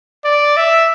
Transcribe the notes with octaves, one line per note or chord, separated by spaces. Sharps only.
D5
E5